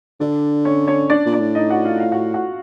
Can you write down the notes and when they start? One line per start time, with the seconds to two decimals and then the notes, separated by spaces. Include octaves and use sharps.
0.20 D3 D4 D5
0.65 C#4 C#5
0.87 C#4 C#5
1.10 D4 D5
1.26 A#2
1.33 D4 D5
1.40 A2
1.55 D#4 D#5
1.70 F#4 F#5
1.85 F4 F5
2.00 F4 F5
2.12 F#4 F#5
2.34 F#4 F#5